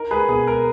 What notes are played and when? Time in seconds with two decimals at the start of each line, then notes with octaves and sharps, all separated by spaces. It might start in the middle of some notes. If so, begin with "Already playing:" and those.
Already playing: D#4 A#4
0.11 G#3 G#4 B4
0.29 B2 G#4
0.47 G#3 A#4